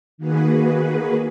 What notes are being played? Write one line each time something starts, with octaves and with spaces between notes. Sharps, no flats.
D#3 A#3 F#4 G#4 B4